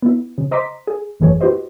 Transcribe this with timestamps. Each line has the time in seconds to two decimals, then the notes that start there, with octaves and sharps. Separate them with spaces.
0.02 B3 E4
0.38 C#3
0.51 C5 D#5 A#5 C6 D6 B6
0.87 G#4
1.20 G#1 F#2 E3 A3 G#4 C#5
1.41 E4 F#4 G4 B4 C5 D#5